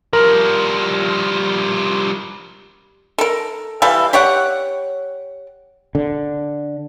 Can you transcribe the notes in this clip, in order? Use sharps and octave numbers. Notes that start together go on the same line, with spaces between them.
F3 G3 A#4
A4 A#4
E3 G3 A4 F5
G4 C#5 D5 F#5
D3